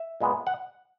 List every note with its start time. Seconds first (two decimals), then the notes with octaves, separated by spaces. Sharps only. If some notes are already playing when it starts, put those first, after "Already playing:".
Already playing: E5
0.21 A#2 G#3 B3
0.47 F#5